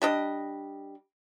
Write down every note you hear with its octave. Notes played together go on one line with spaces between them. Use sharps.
G3 D4 D#5